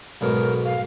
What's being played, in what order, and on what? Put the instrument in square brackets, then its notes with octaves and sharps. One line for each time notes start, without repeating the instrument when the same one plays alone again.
[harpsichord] B1 G#2 B2 [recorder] A#4
[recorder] F5